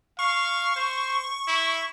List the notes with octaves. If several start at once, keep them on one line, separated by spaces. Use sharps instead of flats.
F5 C#6
C5
E4